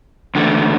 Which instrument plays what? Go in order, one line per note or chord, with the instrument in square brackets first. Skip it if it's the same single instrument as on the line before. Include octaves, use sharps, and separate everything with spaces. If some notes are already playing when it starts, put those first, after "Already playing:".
[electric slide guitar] E2 D3 A3